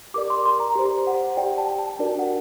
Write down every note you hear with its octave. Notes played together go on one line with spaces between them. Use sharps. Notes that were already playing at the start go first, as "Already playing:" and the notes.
G4 A#4 D5 D6
C6
C6
A#5
G4 C5
F#5
G4 D5 G5
A5
A5
D4 F#4 A#4 D5 A5
F#5